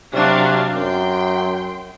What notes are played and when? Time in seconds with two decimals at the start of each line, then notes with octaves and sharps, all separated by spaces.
0.14 C3 F#3 D4 F5
0.74 F#2 G5 C6